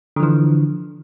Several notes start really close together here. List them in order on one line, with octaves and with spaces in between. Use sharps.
D3 F3 E3